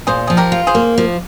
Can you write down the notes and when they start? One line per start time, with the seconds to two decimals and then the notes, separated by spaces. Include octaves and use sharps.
0.07 A#2 G#4 C5
0.27 F3 G#4
0.37 G4 A#4
0.52 F4
0.67 G#4 C5
0.75 A#3
0.98 F3